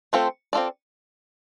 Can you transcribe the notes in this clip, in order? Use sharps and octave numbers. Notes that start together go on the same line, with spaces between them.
A3 C4 F4 A4 C5
C4 F4 A4 D5